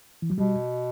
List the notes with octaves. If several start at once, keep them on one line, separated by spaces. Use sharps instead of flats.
E3
F#3
B2 G3